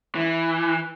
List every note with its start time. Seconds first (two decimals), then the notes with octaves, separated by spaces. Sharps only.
0.15 E3